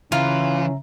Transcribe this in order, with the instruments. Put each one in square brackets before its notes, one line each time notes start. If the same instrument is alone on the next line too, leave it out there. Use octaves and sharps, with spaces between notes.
[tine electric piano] C#3 E5 A#5 [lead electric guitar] E3 [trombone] C#4 [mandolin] F4